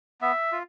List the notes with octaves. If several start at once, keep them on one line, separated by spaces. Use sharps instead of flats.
B3 E5
F4